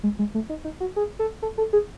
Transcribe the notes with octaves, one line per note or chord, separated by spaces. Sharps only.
G#3
G#3
A3
D#4
D#4
F#4
G#4
A4
A4
A4
G#4